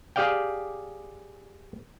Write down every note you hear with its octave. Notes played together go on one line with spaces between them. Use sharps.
G4 G#4 D5 F5 G5